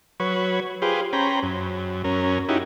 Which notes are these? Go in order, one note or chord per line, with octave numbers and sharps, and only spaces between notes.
F#3 B4 C#5
F4 G4 G#4 B4 C5
C#4 C5 G5 A#5 B5
F#2
F#2 C#4 A#4
C#4 D#4 E4 F#4 G4